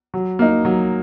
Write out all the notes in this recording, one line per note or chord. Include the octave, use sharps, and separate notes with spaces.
F#3
A#3 D#4
F#3